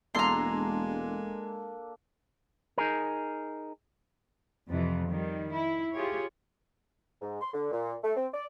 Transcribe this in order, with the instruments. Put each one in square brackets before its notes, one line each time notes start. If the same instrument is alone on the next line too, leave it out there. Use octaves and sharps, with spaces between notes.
[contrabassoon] E1 [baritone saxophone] G#3 [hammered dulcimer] A#3 D4 A4 [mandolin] A#5 C6
[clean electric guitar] D#4 G#4 A#4
[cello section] F2 C3 E3
D#3 G3
E4
F4 G4 G#4 C#5
[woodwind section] G#2
C6
D3
A#2
A3
C4
D5